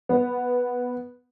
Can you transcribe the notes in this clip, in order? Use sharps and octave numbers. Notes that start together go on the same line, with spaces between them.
B3